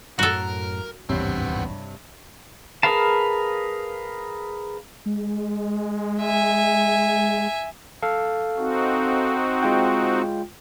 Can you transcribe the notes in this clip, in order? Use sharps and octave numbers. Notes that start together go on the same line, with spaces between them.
F#2 A2 F#3 F#4 A4 A#4
D1 G#1 E2 G2 C3 B3 C4 C#5
G#4 A#4 B4 F5 A5
G#3
E5 G#5
A4 F5
C4 D#4 F#4
G#3 F4 G5